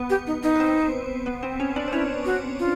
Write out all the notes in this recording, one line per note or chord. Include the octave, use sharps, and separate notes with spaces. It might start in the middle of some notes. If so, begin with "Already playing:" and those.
Already playing: B3 B4
G4
D#4
D#4
B4
C4 C5
B3 B4
C4 C5
C#4 C#5
D4 D5
C5
C#4 E4 C#5
F#4
F4